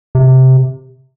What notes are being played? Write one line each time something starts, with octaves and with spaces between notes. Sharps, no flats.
C3